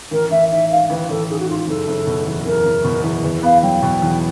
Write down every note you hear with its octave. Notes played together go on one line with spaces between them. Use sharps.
A1 A#4
A1 E5
D#3 E5
G#2 F5
A1 B4
A1 A4
D#3 G#4
F#4
G#2 F4
F4
F#1 A4
F#1
B2
E2
F#1 A#4
F#1
B2
E2
E2 B4
B3 F5
F#3 G5
B2
E2